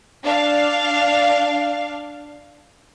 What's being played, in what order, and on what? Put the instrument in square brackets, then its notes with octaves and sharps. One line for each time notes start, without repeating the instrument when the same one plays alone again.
[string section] D4 F5